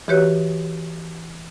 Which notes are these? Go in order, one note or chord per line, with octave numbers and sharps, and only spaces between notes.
E3 F#4 G4 B4 C#5 F#6